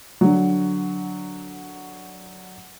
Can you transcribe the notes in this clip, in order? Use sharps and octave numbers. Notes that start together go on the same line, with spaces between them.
D3 F#3